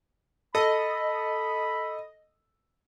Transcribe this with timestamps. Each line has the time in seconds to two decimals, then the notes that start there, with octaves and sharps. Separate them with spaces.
0.55 A4 D#5 B5